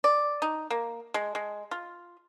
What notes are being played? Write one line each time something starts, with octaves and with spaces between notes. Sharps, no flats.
D5
D#4
A#3
G#3
G#3
F4